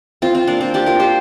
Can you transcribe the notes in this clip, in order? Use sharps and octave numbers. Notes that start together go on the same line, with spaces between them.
C4 F4
C4 F4
A#3 D4
C4 F4
D4 G4
F4 A#4
G4 C5